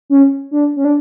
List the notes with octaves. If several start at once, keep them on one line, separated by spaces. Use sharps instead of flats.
C#4
D4
C#4
D4